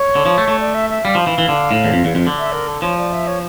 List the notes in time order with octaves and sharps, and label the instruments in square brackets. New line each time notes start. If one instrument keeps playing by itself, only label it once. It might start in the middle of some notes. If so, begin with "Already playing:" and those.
Already playing: [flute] C#5
[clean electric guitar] D3
F3
A3
A3
[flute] D5
E5
E5
[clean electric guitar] G3 [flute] F5
[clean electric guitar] F3
E3
E3
D3
A2
E2
F2
E2
F2
D3
[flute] E5
A#4
A4
[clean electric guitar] F3 [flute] C#5
[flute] D5
E5
C#5